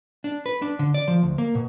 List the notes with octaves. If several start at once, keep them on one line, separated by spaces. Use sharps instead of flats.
D4
B4
D4
D3
D5
F3
D2
A#3
B2